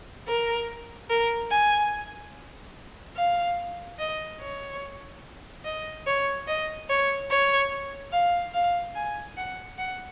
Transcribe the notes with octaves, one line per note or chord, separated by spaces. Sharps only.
A#4
A#4
G#5
F5
D#5
C#5
D#5
C#5
D#5
C#5
C#5
F5
F5
G#5
F#5
F#5